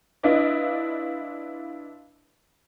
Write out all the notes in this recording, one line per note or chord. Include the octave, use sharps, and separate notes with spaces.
D4 E4 F4 B4 D5 D#5